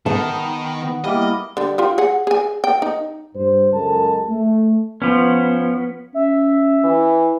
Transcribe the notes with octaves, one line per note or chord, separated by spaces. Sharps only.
D#3 B3 A5
B3
G3 A#3 E4 D#5
D3 G3
F4 G4
G#4 F#5
G#4 G#5
G5
D#4
G2 C5
C#2 F#2 G#3 A4 A#4 A5
A3
F3 B3 C#4
C#4 E5
E3